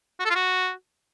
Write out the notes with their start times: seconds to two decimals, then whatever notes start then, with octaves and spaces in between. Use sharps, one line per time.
0.20 F#4
0.25 A4
0.30 F4
0.35 F#4